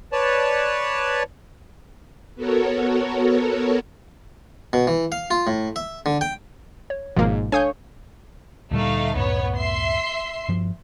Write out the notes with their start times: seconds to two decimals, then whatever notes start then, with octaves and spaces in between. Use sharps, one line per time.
0.13 B4 C#5 D5 A5
2.35 B3 F#4 A4 A#4 C#5
4.73 B2
4.87 E3
5.12 F5
5.31 F4
5.47 A2
5.76 E5
6.06 D3
6.21 G5
6.90 C#5
7.16 G#1 G#2 B2 F3 G#3 A#3
7.52 D4 A4 C#5 F5 G#5 D#6 G6
8.71 D2 A#2 G3 A3 D#4 F5
9.15 C#2 F#2 A2 B3 C#5
9.56 E5 C6 C7
10.49 G2 F3